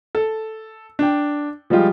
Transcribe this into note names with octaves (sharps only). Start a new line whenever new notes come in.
A4
D4 G5
F3 G3 G#3 F4 G4